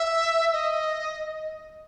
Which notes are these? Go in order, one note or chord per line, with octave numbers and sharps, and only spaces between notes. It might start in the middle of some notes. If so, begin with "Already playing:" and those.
Already playing: E5
D#5